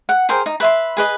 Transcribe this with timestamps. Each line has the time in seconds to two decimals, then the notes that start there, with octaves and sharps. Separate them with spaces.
0.09 F#5
0.29 G#4 A#4 C5 G5
0.46 D#4
0.60 B4 E5 C6
0.97 G#4 B4 D#5